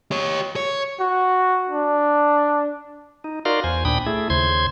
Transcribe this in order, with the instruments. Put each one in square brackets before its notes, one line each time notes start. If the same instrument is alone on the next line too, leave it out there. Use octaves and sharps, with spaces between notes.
[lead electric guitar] G4 C#5
C#5
[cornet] F#4
D4
[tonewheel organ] D#4
D#4 F#4 A#4 D5 F5 C6
E2 C5 G#5
D#2 A#2 D4 G5 B5 D#6
A3 E4 G#4
D#2 C#3 C5 C6 G#6